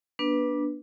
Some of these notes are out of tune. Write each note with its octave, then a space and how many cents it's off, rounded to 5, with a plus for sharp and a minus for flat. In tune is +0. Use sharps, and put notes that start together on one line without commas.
B3 -40 D4 +0 B4 -5